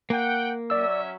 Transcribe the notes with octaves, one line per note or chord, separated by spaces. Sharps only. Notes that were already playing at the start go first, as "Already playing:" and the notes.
A#3 F#5 G5
F#3 C#4 D5 E5 E6